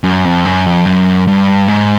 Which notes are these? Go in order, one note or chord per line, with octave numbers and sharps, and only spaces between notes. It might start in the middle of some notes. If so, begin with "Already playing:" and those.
F#2
F2
F#2
F2
F#2
G2
G#2